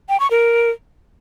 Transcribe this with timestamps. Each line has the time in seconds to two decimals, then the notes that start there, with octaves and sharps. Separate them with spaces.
0.09 G5
0.20 C#6
0.31 A#4